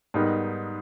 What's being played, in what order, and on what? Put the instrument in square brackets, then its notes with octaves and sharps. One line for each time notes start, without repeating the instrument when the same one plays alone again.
[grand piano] G#2 G3 B3 D#4 A#4